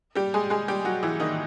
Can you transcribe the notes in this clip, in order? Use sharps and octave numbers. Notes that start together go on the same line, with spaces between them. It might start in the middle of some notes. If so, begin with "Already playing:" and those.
G3 G4
G#3 G#4
G#3 G#4
G3 G4
F#3 F#4
E3 E4
D#3 D#4